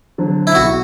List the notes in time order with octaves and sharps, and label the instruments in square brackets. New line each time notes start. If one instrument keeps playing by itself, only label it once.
[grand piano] D3 F#3 C4
[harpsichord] E4
[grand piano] B1 [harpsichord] F#4